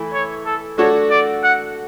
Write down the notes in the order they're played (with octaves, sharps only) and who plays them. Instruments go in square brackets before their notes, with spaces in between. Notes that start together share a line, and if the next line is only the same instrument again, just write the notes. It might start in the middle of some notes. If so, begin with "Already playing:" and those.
Already playing: [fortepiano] E3 A3 E4
[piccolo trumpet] C#5
A4
[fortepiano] A3 D4 F#4 A4 [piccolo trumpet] C#5
[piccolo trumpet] D5
F#5